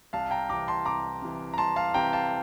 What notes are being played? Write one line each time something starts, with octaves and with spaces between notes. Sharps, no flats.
C2 F5 A5
G5 A#5
C3 E3 A#5 D6
A5 C6
C2 A#5 D6
C3 E3
A#5
C2 A5 C6
F5 A5
C3 E3 G5 A#5
F5 A5